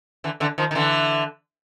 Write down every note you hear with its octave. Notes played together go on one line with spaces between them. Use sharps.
D3 E3
D3 E3
D#3 F3
D#3
D3 E3